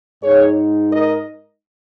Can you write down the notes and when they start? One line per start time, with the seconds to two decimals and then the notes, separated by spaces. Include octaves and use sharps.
0.22 G#2 G#3 D#4 G#4 C#5
0.91 A#4 D#5